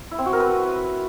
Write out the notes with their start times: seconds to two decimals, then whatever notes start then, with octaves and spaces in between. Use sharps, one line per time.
0.11 E4
0.18 C4
0.26 F#4
0.33 A#4
0.40 B4